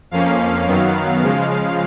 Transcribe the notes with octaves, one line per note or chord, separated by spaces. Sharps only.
F2 F3 A#3 C#4 F5
F#2 D#3 F#3 B3
C#3 F3 G#3